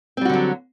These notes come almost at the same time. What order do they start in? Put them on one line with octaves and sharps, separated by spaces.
C4 G3 F#4 D3 F#3